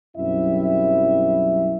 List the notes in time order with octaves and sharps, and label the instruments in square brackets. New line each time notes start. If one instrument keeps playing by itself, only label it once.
[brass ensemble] B1 F#2 G3 C4 E4 E5